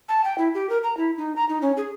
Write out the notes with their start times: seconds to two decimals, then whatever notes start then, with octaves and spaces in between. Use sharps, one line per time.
0.09 A5
0.24 G5
0.38 E4
0.54 G4
0.69 A#4
0.83 A#5
0.97 E4
1.18 D#4
1.36 A#5
1.49 D#4
1.62 C#4
1.77 G#4